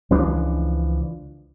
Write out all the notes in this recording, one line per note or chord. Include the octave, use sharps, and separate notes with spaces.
C#2 E3 F3 D4